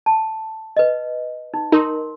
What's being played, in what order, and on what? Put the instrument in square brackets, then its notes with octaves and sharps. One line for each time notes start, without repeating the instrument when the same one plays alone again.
[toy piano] A5
B4 D#5
D#4
[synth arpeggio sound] D#4 [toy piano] A#4 C6